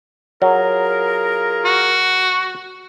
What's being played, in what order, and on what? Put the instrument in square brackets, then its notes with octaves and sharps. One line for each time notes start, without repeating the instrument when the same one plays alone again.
[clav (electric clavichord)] F#3 [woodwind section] F4 G#4 A#4
[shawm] F#4